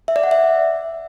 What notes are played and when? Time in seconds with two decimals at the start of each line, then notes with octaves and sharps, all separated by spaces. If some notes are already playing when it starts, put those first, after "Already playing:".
0.08 E5
0.16 D5
0.24 F#5
0.31 E5